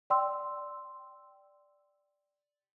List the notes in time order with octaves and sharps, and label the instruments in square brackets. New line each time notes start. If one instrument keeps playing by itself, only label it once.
[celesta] D5 G5 C6 E6